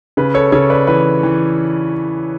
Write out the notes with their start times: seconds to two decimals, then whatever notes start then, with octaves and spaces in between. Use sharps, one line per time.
0.17 C#3 B4
0.34 A4 C#5
0.52 C#3 A4 C#5
0.70 B4 D5
0.87 E3 B4
1.23 E3